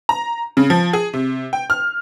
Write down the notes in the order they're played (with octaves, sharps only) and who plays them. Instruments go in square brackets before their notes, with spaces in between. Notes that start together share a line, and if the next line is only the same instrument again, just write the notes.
[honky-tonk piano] A#5
C#3
F3
G#4
C3
G5
F6